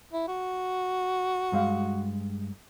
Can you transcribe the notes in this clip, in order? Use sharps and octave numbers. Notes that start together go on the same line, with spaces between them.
E4
F#4
G2 G#3 F5